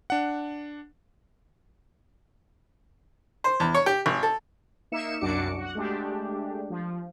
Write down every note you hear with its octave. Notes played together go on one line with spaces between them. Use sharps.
D4 F#5
C5
E2
C#5
G4
G#1
A4
A#3 D#4 E5 C#7 E7
C2 F#2 D4 F#4 D6 C#7
F#4 F#5
G#3 A3 D4 G4
F3